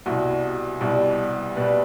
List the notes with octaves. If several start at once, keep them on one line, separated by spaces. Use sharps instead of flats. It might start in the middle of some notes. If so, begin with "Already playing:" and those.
C2 B2 G3 F#4
C2 B2 G3
B2 G3 B4